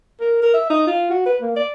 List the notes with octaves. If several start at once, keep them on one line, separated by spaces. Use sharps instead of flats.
A#4
A#4
E5
D#4
F4
F#4
B4
A#3
D5